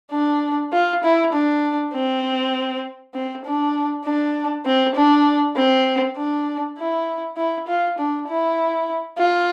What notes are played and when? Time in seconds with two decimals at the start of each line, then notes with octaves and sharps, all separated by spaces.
0.11 D4
0.72 F4
1.03 E4
1.33 D4
1.94 C4
3.14 C4
3.45 D4
4.04 D4
4.65 C4
4.95 D4
5.56 C4
6.16 D4
6.77 E4
7.37 E4
7.67 F4
7.98 D4
8.28 E4
9.18 F4